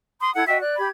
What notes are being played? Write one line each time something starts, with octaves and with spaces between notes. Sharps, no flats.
B5 C6 D#6
E4 A4 F#5 G#6
F#4 D#5 E5 G5
D5 F#6
G4 B5 G#6